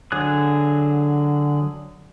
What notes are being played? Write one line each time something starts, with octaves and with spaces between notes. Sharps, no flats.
D3 F#3 G#4 F#6